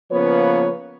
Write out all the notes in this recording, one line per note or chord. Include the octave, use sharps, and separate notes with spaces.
C#3 F3 A#3 B3 B4 C#5